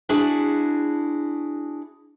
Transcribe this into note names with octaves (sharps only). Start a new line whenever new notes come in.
D4 E4 F#4 G#4